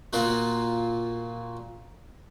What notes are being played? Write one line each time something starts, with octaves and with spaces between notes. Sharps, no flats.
A#2 A#3 F4 F#4